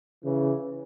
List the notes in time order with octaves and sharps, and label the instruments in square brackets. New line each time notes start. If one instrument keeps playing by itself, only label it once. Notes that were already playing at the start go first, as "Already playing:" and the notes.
[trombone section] C#3 E3